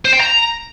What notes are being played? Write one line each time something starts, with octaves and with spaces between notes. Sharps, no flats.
C5
G5
A#5